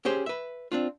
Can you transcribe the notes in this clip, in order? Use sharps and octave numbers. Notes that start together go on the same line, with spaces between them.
C#4 G4 G#4 C5
B4 E5
C4 D4 F4